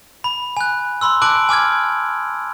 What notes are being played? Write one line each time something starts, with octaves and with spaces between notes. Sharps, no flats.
B5
G#5 F#6
B5 C6 E6
A5 D6 F#6 D7 F#7
G#5 D6 F6 G#6